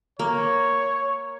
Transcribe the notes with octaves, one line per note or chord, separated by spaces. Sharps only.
A#3 C#5